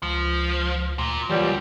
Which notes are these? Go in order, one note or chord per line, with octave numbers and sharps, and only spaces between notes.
C#2 F3
D2 A#2
C#2 A#2 E3 F#3 G3